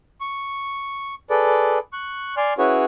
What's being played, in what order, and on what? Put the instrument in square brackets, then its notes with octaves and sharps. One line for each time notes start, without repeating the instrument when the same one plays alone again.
[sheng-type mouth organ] C#6
G#4 A4 B4 D5
C#6 F#6
D5 G#5 C6 F6
C#4 E4 F#4 G#4 B4 C#5